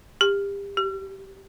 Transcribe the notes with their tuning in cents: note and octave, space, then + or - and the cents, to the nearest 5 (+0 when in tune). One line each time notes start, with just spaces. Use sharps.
G4 +30
G4 -20